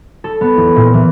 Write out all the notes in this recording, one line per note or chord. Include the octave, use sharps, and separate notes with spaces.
A4
B3
E2
A#2
E3